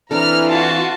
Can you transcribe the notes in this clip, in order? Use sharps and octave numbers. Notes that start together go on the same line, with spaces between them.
E3 C4 D4 A4 A#5 F6
F4 F#4 A5